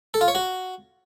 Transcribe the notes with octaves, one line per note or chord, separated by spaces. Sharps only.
A4
F4
C#5
F#4